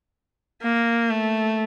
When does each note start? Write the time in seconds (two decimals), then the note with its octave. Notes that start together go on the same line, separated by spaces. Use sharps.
0.63 A#3
1.10 A3